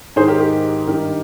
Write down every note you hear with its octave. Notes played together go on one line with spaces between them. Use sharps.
G#2 D#3 G#4 C5
G4 A#4
G4 A#4
G2 D#3 G4 A#4